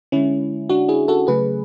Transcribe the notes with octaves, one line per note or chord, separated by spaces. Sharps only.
D3 G#3 C#4 E4
D4 F#4
E4 G#4
F#4 A4
C#3 F#3 A3 G#4 B4